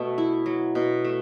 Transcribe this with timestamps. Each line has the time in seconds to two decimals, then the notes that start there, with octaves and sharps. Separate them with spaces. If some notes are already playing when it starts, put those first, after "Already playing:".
Already playing: B2 A3
0.18 E4
0.46 F#3
0.75 B2
1.05 A3